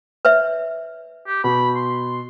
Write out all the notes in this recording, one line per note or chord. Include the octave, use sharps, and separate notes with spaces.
B4 C#5 E5
G4
B2 B5
C6